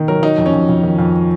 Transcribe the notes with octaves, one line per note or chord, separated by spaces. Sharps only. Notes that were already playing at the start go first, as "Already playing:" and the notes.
Already playing: D#3
F#3 A#4
F#3 D#4
F2
C#4
F2
F2
D#3
F2